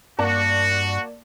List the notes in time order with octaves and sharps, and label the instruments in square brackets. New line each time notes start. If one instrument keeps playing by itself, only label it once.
[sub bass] G2 [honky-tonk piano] A#3 D5 A5 [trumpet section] F#4